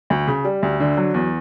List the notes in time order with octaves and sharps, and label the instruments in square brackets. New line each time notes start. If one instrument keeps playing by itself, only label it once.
[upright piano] D2
C#3
G3
D2
D3
F#3
E2